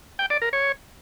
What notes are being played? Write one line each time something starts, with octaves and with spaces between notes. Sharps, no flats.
G5
D5
A#4
C#5